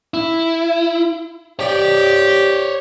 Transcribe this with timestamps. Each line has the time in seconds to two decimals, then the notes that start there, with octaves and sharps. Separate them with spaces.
0.14 E4
1.59 G4 C#5 D5